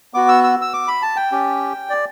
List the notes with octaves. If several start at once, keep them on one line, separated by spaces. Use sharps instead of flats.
B3 F#4 D6
E6
E6
E6
D6
B5
A5
G5
C#4 G4
D5